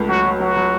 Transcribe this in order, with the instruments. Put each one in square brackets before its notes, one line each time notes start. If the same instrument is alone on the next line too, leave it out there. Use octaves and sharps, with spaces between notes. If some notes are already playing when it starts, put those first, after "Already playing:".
Already playing: [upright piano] C#2 A3
[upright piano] F#3 [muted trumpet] F#4
[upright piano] F#3
[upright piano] F#3 [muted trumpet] F#4
[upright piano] F#3